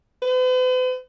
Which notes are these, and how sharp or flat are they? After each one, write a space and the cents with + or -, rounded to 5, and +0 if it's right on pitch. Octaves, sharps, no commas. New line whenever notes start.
B4 +45